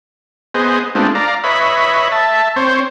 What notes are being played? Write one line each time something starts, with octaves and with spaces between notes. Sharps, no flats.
B3 G#4 C5 D#5
G#3 A3 B3 C4 D4 F4
D5 F5 A#5
B4 C#5 D#5 E5 B5
E5 A5
C4 C5 C#5